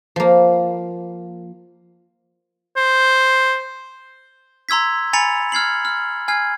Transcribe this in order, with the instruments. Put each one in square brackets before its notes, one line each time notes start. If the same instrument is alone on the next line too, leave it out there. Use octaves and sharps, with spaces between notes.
[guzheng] F3 A#3
[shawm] C5
[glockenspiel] A#5 C6 E6 G#6 B6
G#5 A#5 B5 A6 C#7 F7
F6 G#6 C7 F#7
F6
G#5 F6 G#6 C7